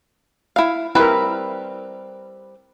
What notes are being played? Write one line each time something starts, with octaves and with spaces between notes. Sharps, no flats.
E4 F5
G3 C4 E4 A#4 B4